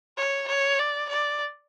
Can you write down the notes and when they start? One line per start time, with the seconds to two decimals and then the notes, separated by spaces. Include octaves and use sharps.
0.18 C#5
0.48 C#5
0.79 D5
1.09 D5